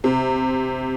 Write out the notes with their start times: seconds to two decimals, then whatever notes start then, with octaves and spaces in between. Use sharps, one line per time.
0.04 C3